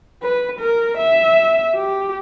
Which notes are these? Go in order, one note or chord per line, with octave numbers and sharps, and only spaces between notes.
B4
A#4
E5
G4